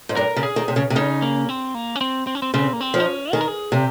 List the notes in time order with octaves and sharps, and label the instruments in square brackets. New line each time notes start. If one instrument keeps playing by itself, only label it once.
[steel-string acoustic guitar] G#2
[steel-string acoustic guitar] G2 [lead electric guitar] A#4
[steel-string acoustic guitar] C#3
[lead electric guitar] G#4
[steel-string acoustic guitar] D#3
C3
C#3
C3
[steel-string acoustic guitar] C#3 [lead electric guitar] D#4
[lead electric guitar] A#3
C4
A#3
C#4
C4
C4
C#4
C4
[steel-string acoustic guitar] C#3 [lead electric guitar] C4
[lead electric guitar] A#3
C4
[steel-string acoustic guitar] F3
[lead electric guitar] D#4
C#4
[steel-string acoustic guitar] D#3 [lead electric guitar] G#4
[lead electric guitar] A#4
G#4
[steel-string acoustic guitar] C3 [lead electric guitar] G4